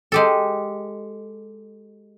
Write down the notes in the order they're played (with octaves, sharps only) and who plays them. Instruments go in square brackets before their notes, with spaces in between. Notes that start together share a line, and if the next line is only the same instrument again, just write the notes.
[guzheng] G#3 G4 A4